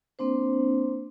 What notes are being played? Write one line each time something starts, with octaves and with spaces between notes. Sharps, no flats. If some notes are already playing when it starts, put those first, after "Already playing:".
A#3 C4 D4 C5